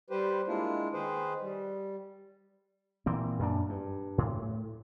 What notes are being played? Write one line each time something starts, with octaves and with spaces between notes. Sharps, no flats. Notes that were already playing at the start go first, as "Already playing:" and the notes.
G3 G4 B4 C5
G#3 A#3 D4 E4 F4
D#3 G#4 B4 C5
G3
A#2 E3 C4
F#2 A#2 D4
G2
A2